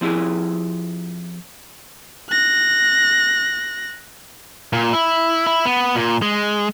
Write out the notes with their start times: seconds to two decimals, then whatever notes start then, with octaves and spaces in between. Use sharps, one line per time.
0.01 F3 C4 E4 G4 G#4
2.30 F#6 A#6
4.73 A#2
4.93 E4
5.47 E4
5.65 B3
5.95 A#2
6.22 G#3